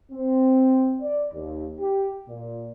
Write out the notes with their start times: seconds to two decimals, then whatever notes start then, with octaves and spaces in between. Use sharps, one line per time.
0.12 C4
1.02 D5
1.34 D#2
1.79 G4
2.29 A#2